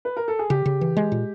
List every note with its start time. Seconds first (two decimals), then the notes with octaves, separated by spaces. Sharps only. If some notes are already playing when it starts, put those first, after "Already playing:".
0.05 B4
0.17 A#4
0.28 A4
0.39 G#4
0.50 C#3 G4
0.66 C#3
0.81 E3
0.97 G#3
1.12 A#2